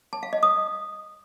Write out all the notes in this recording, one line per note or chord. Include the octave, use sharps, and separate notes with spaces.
A5
F5
D#5
D#6